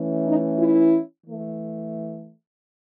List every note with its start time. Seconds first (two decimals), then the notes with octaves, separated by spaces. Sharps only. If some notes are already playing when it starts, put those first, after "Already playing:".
Already playing: E3 A3 C#4
0.25 D#4
0.58 E4
1.26 E3 A3